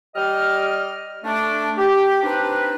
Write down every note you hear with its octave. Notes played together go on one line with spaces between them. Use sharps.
G3 D#5 F6
A3 D4
G4
C4 D4 D#4 B4